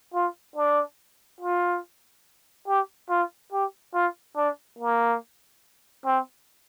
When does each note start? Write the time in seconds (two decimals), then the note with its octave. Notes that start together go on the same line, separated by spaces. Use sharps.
0.14 F4
0.56 D4
1.41 F4
2.67 G4
3.10 F4
3.52 G4
3.94 F4
4.36 D4
4.79 A#3
6.06 C4